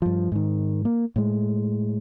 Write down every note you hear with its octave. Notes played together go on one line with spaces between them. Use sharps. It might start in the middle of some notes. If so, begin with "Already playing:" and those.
G2 F3
G#2 D#3
A#3
A2 G#3